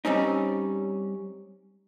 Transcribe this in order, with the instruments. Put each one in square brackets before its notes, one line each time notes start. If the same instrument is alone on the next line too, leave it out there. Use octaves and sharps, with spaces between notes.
[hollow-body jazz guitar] G3 C4 C#4 D#4